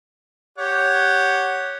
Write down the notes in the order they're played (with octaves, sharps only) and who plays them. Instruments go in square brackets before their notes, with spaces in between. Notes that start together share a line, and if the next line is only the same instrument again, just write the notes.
[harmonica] G4 C#5 F#5